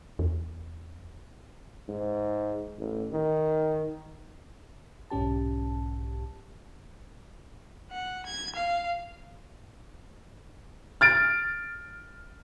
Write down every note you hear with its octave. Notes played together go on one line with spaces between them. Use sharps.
E2
G#2
A1
D#3
B1 G#2 C#4 G4 A5
F#5
G#6
F5
F6 A6 D7